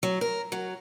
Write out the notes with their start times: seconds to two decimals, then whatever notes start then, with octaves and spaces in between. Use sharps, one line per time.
0.03 F#3
0.21 A#4
0.52 F#3